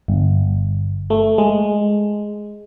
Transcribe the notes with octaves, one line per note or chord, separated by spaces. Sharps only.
G1
A3
G#3